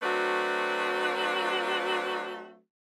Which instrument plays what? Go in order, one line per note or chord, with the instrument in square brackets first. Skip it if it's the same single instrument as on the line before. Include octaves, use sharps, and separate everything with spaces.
[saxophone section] F#3 A3 C4 D4 F#4 B4